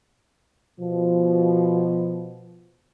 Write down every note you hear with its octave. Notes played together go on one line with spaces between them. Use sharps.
B2 F3